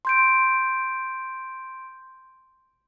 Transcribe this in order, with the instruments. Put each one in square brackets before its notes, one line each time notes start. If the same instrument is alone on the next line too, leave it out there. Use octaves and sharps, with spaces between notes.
[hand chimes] C6 G6 D7